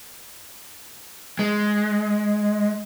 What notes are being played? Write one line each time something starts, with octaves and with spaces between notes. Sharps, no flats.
G#3